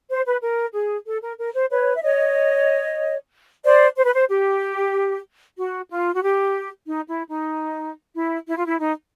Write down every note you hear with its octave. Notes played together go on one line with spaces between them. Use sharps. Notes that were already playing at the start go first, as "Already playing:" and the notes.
C5
B4
A#4
G#4
A4
A#4
A#4
C5
B4 C#5
E5
C#5 D#5
C5 D5
C5
B4
C5
G4
F#4
F4
F#4
G4
D#4
E4
D#4
E4
E4
F4
E4
D#4